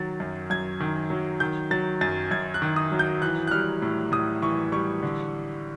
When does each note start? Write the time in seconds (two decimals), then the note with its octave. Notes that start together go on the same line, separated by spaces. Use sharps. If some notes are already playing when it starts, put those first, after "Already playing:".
Already playing: D#3 F#3 A6
0.20 F#2
0.50 F#2 G#6
0.80 D#3
1.10 F#3
1.40 D#3 G6
1.71 F#3 A6
2.01 F#2 A6
2.31 F#2 G#6
2.54 F#6
2.62 D#3
2.76 D#6
2.92 F#3
2.99 G6
3.22 E3 F#6
3.47 F#6
3.51 G3 F6
3.82 A2
4.12 A2 D#6
4.42 E3 C#6
4.72 G3 C#6
5.02 D3